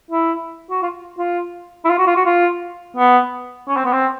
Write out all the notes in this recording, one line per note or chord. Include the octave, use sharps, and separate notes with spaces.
E4
F#4
F4
F4
E4
F4
F#4
F4
F#4
F4
B3
C#4
C4
B3
C4